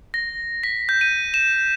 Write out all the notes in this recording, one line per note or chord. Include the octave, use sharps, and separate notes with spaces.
A#6
B6
G6
D#7
E7